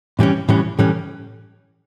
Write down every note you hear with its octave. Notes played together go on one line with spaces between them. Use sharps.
A2 E3 G3 C#4
A2 E3 G3 C#4
A2 E3 G3 C#4